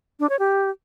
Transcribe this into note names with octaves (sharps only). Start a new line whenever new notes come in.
D4
C#5
G4